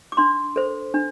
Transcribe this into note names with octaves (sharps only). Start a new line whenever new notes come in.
D6
D4 C6
A4 C5
D4